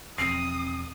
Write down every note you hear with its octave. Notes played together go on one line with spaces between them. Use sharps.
E1 E2 F3 C4 D#6 C7